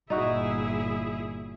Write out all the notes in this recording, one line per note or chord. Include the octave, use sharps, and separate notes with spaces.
G1 A#2 D#4 E4 F#4 G#4 D#5